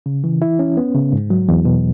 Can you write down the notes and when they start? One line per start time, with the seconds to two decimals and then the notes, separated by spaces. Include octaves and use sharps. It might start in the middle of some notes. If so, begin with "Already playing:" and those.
0.06 C#3
0.24 E3
0.42 E4
0.59 C#4
0.77 B3
0.95 C#3
1.13 G#2
1.30 F#3
1.48 E2
1.65 B2